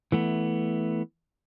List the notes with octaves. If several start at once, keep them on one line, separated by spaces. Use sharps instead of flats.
E3 A3 B3